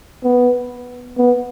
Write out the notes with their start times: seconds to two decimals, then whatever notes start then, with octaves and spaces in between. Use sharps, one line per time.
0.24 B3
1.18 B3